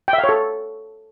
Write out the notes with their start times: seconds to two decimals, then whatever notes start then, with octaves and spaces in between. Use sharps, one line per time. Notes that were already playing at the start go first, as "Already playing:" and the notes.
0.08 G5
0.13 E5
0.18 F5
0.24 C#5
0.29 A4